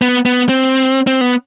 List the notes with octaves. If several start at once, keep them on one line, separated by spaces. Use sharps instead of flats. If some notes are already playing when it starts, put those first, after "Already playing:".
B3
B3
C4
C4
B3